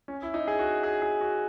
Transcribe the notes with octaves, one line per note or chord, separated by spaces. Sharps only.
C#4
E4
D#4
G#4
F#4
G#4
G#4
F#4